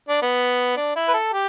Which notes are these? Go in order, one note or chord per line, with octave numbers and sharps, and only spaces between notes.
D4
B3
D4
E4
B4
A4
G4